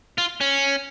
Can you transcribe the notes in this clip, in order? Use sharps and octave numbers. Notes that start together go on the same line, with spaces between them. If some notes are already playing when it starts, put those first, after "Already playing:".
F4
C#4